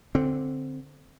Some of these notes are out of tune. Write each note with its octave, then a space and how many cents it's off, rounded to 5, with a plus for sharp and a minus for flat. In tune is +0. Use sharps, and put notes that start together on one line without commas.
D3 +0 C4 +0